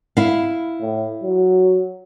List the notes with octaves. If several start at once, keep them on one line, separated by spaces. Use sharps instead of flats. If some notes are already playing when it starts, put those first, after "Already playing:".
E4 F5
A2
F#3